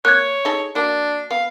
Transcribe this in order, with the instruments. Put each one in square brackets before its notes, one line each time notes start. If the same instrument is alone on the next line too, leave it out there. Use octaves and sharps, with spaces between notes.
[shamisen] A#3 [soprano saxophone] C#5 [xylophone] F#6 G#6
[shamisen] D#4 G#4 A4
[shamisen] A#3 F#4 [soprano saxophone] D4
[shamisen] B3 [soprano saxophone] F5